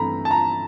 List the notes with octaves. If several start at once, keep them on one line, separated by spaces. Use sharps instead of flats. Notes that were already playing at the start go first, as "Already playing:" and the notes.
Already playing: G2 E3 A3 C4 A#5 B5
A5
A#5